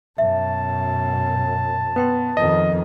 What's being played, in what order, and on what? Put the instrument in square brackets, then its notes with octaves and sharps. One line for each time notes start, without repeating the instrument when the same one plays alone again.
[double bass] F#2 B2 [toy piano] E5 [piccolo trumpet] A5
[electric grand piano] B3 [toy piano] B4 G5 C6
[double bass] F2 D#3 [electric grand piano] D#5